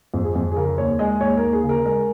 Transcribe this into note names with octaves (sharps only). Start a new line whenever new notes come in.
F2
G#4
F2
G#4
C#3 A#4
D#2 C#5
G#3 D#5
D#2 C#5
A#4
D#2
G#4
C#3
A#4
G#3 A#4